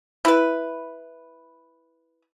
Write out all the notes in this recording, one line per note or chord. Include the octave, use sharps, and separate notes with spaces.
E4 B4